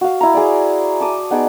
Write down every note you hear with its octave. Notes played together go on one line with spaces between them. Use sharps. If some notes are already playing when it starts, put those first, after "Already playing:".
F#4 F5
E4 A#5
G#4 D5
A5 D6 D#6
B3 D#4 G#4 D5